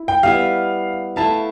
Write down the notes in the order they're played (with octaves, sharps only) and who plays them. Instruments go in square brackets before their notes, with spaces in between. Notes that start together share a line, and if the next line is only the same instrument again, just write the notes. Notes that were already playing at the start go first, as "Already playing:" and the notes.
Already playing: [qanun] E4
[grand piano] G5
[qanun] G3 B3 E4 B4 [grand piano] F5
[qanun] A3 E4 B4 F5 [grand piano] A5